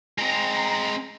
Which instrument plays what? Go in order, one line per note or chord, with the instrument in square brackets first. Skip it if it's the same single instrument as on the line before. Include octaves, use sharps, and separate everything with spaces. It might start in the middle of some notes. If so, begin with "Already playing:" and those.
[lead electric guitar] G#3 C4 [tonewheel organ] A#5